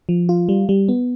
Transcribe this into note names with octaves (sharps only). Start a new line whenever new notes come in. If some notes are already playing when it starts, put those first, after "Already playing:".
F3
F4
G3
G3
B3